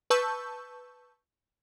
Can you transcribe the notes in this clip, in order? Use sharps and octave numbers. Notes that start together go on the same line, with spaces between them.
B4 A5 C#6 E6 G6